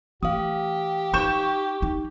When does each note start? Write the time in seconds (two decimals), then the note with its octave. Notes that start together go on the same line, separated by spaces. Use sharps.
0.23 E3 A3 G4 F5 D#6
1.14 D#4 C#6 G6 E7
1.82 D#4